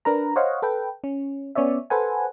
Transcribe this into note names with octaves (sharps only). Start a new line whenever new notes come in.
D4 A#4 B4 A#5
C5 C#5 D#5 F5 F#5
A4 B4 G5
C#4
B3 C#4 C#5 D5 E5
A4 B4 C5 F#5 G#5